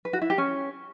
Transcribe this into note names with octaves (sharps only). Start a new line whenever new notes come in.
B4
F#4
E4
G4
C#4